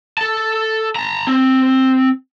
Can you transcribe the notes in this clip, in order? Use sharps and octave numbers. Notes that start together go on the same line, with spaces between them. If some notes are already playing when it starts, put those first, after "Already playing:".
A4 A5
A5 A#5
C4